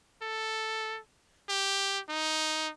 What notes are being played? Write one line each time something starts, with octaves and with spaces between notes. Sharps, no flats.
A4
G4
D#4